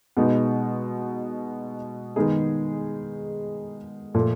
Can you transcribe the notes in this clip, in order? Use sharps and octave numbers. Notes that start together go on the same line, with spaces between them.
B2 G#3 B3 D#4
D#3 G#3 B3 D#4 G#4
A#2 F3 A3